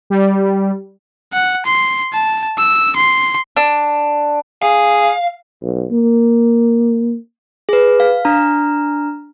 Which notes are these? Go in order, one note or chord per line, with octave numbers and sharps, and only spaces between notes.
G3
F#5
C6
A5
E6
C6
D4
G#4 F5
B1
A#3
G#4 B4
F5
D4 A#5 F6